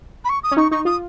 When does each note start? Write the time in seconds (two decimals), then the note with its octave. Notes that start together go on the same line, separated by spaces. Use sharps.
0.24 B5
0.29 C#6
0.43 D#6
0.51 C#4
0.57 D#4 C#6
0.71 D#4 C#6
0.85 F4 D#6